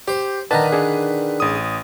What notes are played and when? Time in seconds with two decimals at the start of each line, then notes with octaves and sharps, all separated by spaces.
0.08 G4 C5
0.51 D3 D#3 B4 A5 A#5
0.72 D4 G#4
1.40 A1 D#6